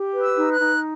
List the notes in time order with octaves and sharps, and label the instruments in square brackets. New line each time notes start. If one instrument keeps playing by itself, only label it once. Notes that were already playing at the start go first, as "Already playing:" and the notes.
Already playing: [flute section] G4
B4
E6
D#4
F#6
D#4